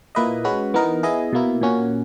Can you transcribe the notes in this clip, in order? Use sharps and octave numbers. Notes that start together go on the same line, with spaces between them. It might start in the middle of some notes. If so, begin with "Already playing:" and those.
A#2 A#3 E4 B4 D#5
G#3 C#4 F#4 B4
E3 B3 D#4 A#4
B3 E4 G#4 D#5
B2 A#3 E4
A#2 A#3 C#4 F#4